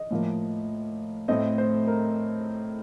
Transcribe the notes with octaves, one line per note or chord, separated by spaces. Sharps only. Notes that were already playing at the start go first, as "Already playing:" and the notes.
Already playing: D#5
A2 F3 A#3
A2 A3 C4 D#5
C5
A#4